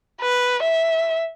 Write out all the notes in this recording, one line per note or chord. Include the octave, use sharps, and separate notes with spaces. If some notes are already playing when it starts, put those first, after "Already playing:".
B4
E5